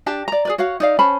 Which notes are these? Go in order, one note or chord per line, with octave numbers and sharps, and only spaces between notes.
D4 G4 A5
D5 A#5
G#4 B4 D5
F#4 C#5 F5 F#5
D#4 D5 F5
C#4 C5 A5 B5